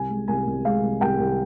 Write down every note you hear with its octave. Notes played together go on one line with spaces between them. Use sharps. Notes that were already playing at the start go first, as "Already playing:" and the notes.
Already playing: C2 G#5
G#3
C2 G#5
C2
G#3 F5
C2
C2 G5
C2